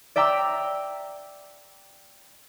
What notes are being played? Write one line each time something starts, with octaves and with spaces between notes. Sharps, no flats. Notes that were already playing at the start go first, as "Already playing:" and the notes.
D5 E5 G5 A#5 D6 E6